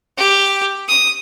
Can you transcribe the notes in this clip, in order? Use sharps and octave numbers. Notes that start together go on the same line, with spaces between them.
G4
D#6